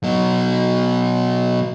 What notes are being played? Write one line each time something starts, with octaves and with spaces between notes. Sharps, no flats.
B2 F#3